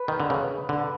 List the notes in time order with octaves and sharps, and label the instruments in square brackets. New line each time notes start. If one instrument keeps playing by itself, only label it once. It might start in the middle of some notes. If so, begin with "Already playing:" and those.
Already playing: [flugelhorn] B4
[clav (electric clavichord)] D#3
D3
[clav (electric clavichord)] C#3 [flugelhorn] B4
[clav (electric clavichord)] D3